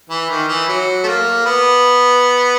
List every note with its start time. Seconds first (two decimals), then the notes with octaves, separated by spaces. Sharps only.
0.09 E3
0.30 D#3
0.49 E3
0.68 F#3
1.03 A3
1.07 A#3
1.45 B3